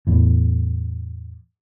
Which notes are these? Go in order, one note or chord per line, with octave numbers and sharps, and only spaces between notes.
E2 A2